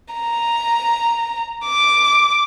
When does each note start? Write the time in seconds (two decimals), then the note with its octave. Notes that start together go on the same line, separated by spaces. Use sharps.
0.15 A#5
1.66 D6